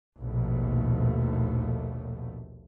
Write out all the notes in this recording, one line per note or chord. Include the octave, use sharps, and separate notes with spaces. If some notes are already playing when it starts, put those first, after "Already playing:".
A#1 D#2 B2 A3